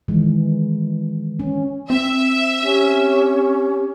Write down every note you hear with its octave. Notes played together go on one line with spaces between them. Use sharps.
D#3 E3 G#3
C#4
C4 E5
C#4 G4